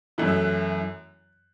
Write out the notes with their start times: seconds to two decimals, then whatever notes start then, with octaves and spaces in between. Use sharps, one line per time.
0.18 F#2 E3 A3 E4 F#6
0.28 E6
0.38 F#6